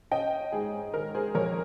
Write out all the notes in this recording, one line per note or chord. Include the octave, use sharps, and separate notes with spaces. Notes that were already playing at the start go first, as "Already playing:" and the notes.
C#4 D#5 G5
G#2 G#4
D#3 A#4
G#4 C5
F2 A#4 C#5